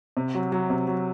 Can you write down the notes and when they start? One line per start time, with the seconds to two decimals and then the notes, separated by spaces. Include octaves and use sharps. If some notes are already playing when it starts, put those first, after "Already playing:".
0.17 C3
0.34 F#3
0.52 F#3
0.70 C3
0.88 F#3